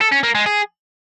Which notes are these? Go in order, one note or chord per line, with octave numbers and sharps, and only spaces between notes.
A4
C#4
A#3
G#3
G#4